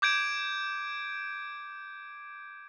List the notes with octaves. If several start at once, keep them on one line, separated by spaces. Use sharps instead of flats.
D6 G6 G#6 D7